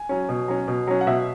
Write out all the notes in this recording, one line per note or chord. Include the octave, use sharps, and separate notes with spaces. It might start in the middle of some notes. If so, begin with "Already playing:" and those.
Already playing: G#5
F#3 C#4
B2
F#3 C#4
B2
F#3 C#4
F#5
B2 E5